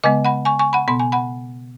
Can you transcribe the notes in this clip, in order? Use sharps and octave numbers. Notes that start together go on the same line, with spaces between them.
C#3 G#3 B3 D#5 G#5
F#5 B5
G#5 C#6
G#5 C#6
F#5 B5
B2 B3 B5
G#5
F#5 B5